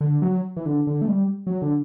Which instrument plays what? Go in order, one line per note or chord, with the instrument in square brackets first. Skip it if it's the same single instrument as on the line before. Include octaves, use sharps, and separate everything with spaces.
[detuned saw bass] D3
F#3
E3
D3
D3
A3
G3
F#3
D3